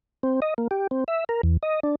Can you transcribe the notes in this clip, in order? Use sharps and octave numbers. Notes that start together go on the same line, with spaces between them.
C4
D#5
A#3
G4
C4
E5
A#4
E2
D#5
D4